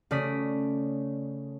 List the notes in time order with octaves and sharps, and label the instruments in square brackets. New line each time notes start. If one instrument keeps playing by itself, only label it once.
[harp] C#3 A3 D5 D#6 B6